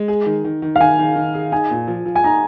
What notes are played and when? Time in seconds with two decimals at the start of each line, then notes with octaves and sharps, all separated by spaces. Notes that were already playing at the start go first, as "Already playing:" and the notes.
Already playing: G#3
0.08 G#4
0.26 D#3
0.45 D#3
0.62 D#3
0.76 F5
0.80 D#3 G#5
0.99 D#3
1.16 D#3
1.34 G#4
1.52 D#4 G#5
1.71 A#2
1.87 F3
2.05 F3
2.16 G#5
2.24 D#4 A#5